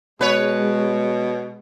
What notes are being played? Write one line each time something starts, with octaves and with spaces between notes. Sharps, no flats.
B2 G#3 B4 C#5